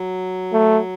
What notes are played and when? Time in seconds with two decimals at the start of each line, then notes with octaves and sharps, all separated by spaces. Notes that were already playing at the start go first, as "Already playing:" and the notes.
Already playing: F#3
0.53 A3